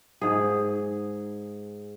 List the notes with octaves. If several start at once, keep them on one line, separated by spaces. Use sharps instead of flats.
G#2 G#4